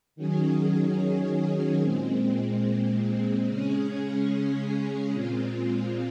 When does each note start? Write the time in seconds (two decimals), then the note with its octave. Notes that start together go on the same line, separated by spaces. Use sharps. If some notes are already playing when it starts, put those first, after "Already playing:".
0.16 D#3 F#3 C#4 G#4
1.81 A#2 G#3 C4
3.47 C#3 G#3 C#4 G#4
5.13 A#2 G#3 C4 F4